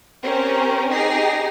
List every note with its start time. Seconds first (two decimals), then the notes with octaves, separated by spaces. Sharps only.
0.22 C4 C#4 G4 A#4 C5
0.91 D#4 G4 G#4 A#6 C7